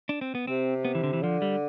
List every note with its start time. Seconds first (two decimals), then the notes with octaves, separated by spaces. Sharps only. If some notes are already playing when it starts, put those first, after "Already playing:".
0.09 D4
0.21 C4
0.35 B3
0.47 C3 C4
0.85 B3
0.95 E3
1.04 D3
1.13 E3
1.23 D3 F3
1.42 G3